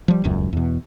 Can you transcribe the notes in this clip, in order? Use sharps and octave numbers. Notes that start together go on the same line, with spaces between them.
F3 G3
D#1 C#2 F#2
E2 B2